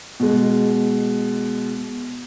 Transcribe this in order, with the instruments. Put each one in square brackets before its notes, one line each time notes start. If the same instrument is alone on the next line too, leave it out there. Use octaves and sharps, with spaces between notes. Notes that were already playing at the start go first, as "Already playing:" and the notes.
[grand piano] B2 G#3